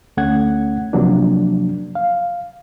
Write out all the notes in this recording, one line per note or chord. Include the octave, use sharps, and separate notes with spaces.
D2 A3 C#4 F#5 G#6
C3 F3 F#3 A#3 D4
F5